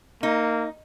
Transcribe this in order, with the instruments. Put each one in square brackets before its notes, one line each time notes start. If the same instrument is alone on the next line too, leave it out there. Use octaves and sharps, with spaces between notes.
[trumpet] A#3 [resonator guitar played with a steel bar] D#4